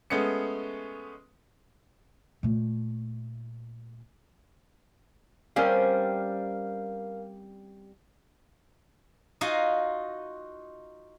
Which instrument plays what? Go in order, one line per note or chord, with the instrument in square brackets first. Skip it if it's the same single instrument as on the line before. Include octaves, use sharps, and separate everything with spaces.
[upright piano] G#3 A3 B3 C#4 C#7
[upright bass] A#2 A3
[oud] G3 C4 C#4 [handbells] A#4 F5
[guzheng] D#4 F4 F#4 D#5 F5 G#5